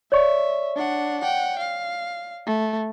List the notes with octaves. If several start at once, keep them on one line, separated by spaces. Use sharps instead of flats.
C#5 D5 E5 C#6
D4 F#5
F#5 G5
F5
A3